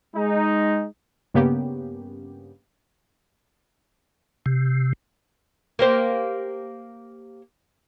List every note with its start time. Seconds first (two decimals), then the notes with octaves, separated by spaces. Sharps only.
0.15 G#3 D#4
1.34 G2 C#3 A#3 B3 C#4 G4
4.46 C3
5.79 A#3 G4 C5